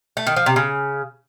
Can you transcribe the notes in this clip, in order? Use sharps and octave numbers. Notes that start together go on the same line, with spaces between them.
A3
D#3
F3
C3
C#3